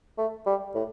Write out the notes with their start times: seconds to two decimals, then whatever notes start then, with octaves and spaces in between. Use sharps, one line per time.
0.18 A3
0.46 G3
0.75 A2